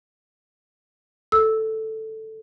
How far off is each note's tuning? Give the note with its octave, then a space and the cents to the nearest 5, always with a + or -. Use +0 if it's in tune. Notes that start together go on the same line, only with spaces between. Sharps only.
A4 +0 E6 +0